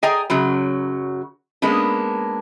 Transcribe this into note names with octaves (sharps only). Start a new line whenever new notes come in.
G#4 D5 D#5 G5 G#5 A#5
F#2 C#3 F#3
G#3 A#3 B3 C#4 D4